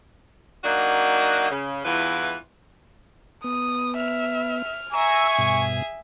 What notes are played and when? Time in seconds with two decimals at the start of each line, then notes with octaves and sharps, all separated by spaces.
0.64 F#3 A#3 D4 D#4 F#4
1.50 C#3
1.85 E2 G2 E3 F4 B4
3.44 B3 D#6
3.97 E5 F6
4.94 G#4 E5 G#5 A#5 C#6 E6
5.39 G2 B2